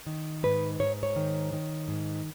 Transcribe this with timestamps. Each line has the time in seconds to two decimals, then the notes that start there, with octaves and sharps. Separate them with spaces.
0.06 D#3
0.43 G#2 B4
0.80 G#2 C#5
1.03 C#5
1.16 D#3
1.53 D#3
1.88 G#2